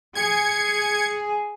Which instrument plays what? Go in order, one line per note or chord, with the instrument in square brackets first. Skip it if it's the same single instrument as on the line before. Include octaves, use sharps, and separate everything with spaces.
[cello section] G#4 [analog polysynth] G#6 C#7